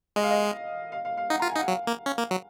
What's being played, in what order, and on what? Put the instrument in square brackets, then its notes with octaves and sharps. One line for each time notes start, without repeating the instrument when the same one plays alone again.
[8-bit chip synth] G#3 [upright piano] D#5
[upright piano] F5
D#5
F5
F5
F5
[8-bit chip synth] D#4 [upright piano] F#5
[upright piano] A#5
[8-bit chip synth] F4
[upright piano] G#5
[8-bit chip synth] D#4
[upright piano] F#5
[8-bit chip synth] F#3 [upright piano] F5
[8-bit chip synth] A#3
C#4
A#3
F#3